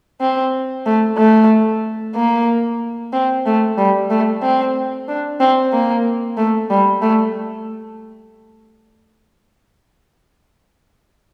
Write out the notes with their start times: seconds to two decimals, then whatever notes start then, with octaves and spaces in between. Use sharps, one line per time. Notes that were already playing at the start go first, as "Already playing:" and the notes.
0.21 C4
0.86 A3
1.18 A3
2.16 A#3
3.13 C4
3.46 A3
3.78 G3
4.10 A3
4.43 C4
5.08 D4
5.41 C4
5.73 A#3
6.37 A3
6.70 G3
7.02 A3